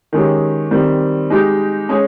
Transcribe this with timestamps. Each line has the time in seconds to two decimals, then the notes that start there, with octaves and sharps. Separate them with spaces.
0.13 D#3 G#3 C#4 G4
0.71 D#3 G3 C4
1.30 G#3 D#4 G4
1.89 G#3 C#4 G#4